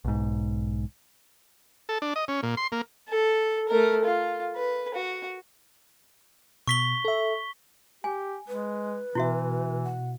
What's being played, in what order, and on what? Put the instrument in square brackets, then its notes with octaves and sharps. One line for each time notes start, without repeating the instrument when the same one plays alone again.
[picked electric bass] B1 G#2
[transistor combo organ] A4
D4
D#5
C#4
A#2
C6
A#3
[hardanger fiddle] A4
A3 A#4
F4
B4
F#4
[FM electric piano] B2 [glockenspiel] C#6 B6 G7
[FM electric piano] A4 E5
[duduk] G4 [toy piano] G#5
[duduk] G#3 [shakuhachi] B4
[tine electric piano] B2 [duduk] E3 [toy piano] E4 F#4 E5
[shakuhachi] F#5